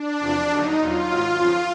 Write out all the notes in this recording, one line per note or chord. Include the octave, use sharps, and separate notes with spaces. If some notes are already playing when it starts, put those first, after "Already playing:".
Already playing: D4
E2 C3 F3
D#2 D3 F#3 D#4
E2 B2 F#3 F4
G#2 D#3 F#3
F2 C#3 F3